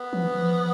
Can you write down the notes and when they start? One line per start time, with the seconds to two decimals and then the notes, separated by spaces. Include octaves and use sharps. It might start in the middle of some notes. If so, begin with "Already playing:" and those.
Already playing: B3
0.13 F3
0.24 E3
0.36 F3